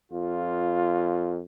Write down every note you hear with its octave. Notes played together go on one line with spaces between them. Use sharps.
F2 F4